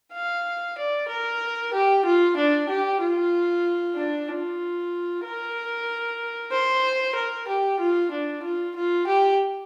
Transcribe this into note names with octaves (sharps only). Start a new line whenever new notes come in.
F5
D5
A#4
G4
F4
D4
G4
F4
D4
F4
A#4
C5
A#4
G4
F4
D4
F4
F4
G4